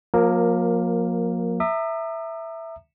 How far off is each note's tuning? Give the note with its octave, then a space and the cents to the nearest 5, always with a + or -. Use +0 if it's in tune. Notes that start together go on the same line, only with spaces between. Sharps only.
F3 +45 A#3 +15 A#4 +0
E5 +0 A#5 -25 D#6 -45